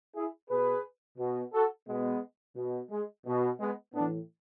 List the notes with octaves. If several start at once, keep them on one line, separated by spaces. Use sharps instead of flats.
E4 G#4
B2 G#4 B4
B2
F#4 A4
B2 G#3 B3
B2
G#3
B2
G#3 B3
A2 E3 B3 D4